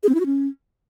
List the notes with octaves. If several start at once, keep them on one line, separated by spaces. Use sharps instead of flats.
G#4
C4
E4
F#4
C#4